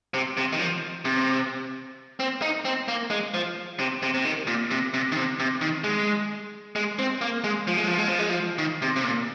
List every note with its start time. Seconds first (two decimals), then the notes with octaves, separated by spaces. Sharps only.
0.14 C3
0.37 C3
0.52 D#3
0.59 F3
1.05 C3
2.20 C4
2.42 D#4
2.65 C4
2.88 A#3
3.10 G#3
3.34 F3
3.79 C3
4.03 C3
4.14 C3
4.25 D#3
4.47 A#2
4.71 C3
4.94 C3
5.12 D#3
5.16 C3
5.40 C3
5.61 D#3
5.84 G#3
6.76 G#3
6.99 C4
7.21 A#3
7.44 G#3
7.67 F3
7.77 G#3
7.88 F3
7.98 G#3
8.09 F3
8.19 G#3
8.29 F3
8.58 D#3
8.82 C3
8.96 C3
9.04 A#2